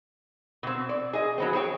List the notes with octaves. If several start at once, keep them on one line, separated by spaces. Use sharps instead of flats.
B2 C4
D5
G#4 D#5
F#3 B3 C4
G#4 C5 C#5 G5